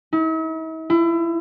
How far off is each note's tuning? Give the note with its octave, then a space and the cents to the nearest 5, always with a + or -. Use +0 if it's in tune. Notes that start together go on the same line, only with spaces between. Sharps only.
E4 -45
E4 +30